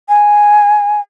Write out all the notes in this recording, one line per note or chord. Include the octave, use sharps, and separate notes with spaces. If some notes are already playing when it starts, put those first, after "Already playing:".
G#5